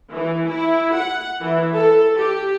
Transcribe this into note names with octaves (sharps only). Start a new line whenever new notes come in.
E3
E4
F#5
E3
A4
G4